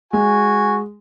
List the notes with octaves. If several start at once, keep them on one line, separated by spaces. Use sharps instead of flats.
G#3 F#4 G#5